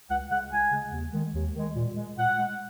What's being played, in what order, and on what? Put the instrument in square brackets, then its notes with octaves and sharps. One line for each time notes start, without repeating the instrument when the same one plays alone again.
[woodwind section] C#2 F#5
C#3 G#3 F#5
C#2 G#5
C#3 G#3
D#2
D#3 G#3
D#2
D#3 G#3
A#2
G#3
A#2 F#5
G#3